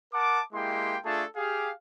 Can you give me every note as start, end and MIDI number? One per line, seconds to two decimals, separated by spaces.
0.13 0.41 70
0.13 0.41 78
0.13 0.41 81
0.13 0.41 86
0.53 0.97 56
0.53 0.97 58
0.53 0.97 64
0.53 0.97 67
0.53 0.97 79
0.53 0.97 84
1.05 1.24 57
1.05 1.24 62
1.05 1.24 65
1.05 1.24 68
1.05 1.24 69
1.05 1.24 81
1.36 1.71 67
1.36 1.71 68
1.36 1.71 77